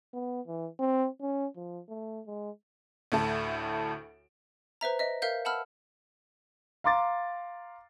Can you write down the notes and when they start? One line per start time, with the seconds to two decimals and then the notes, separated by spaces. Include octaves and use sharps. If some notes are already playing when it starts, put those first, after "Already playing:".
0.14 B3
0.47 E3
0.79 C4
1.21 C#4
1.56 F3
1.89 A3
2.27 G#3
3.12 D2 A2 A4
4.81 B4 C5 E5 A#5
4.99 D#5 E5
5.22 A#4 E5 F5 G6
5.45 F#5 A5 B5 E6 F6
6.84 F5 A#5 C6 D6 A6